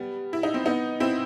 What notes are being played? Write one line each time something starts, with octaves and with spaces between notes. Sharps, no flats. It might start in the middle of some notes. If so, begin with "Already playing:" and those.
Already playing: G3 B3
E4
D#4
C4
B3 D#4
C4 E4